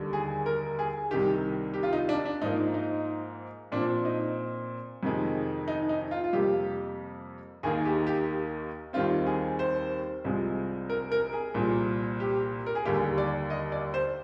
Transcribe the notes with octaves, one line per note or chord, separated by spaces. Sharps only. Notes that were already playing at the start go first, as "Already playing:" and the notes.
Already playing: D#2 D3 G3
G#4
A#4
G#4
C2 C3 D#3 G4
G4
F4
D#4
D4
D4
G#2 F3 A#3 D#4
D#4
A#2 F3 C4 D4
D#4
F2 C3 D#3 G#3
D#4
D#4
F4
F4
F2 C3 G3 A#3 G4
D#2 D#3 A#3 G#4
G4
G4
D#2 D#3 G3 C4 F4
G#4
C5
C2 C3 F3 G#3
A#4
A#4
G#4
C2 A#2 F3
G4
A#4
G#4
D#2 D3 G3 A#3 G4
D5
D#5
D5
C5